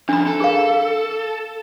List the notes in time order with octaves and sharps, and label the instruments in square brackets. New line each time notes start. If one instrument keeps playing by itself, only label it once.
[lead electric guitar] F2 [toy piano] D4 B5
[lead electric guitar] A4
[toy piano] G#4 A#4 F5